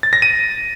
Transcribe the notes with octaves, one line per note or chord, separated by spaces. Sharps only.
A6
A#6
D#7